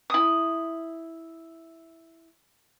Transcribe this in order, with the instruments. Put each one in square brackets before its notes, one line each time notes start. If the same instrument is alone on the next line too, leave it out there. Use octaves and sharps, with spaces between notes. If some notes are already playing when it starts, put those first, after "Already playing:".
[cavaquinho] E4 D#6